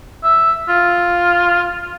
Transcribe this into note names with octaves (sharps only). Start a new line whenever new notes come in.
E5
F4